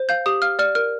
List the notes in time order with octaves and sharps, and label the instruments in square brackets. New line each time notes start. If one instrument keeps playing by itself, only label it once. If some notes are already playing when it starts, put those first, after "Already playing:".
Already playing: [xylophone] C5
F5 G6
G4 D#6
F5 F6
D5 F6
A#4 F6